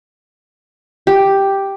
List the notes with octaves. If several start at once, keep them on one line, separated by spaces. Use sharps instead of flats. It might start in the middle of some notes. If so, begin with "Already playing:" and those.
G4